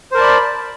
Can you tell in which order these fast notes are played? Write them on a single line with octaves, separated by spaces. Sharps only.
C5 A#4 A5 D5 B5